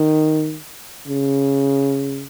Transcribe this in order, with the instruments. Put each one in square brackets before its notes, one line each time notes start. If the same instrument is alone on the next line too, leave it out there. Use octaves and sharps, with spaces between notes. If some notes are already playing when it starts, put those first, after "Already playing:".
Already playing: [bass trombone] D#3
C#3